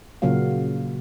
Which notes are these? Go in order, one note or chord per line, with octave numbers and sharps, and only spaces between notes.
A#2 C#3 F#3 A#3 F#4 F5